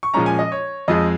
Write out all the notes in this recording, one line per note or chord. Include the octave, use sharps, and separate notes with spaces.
C#6
A#2 F3 G#3 C#4 A#5
G#5
D#5
C#5
F2 F3 G#3 D#5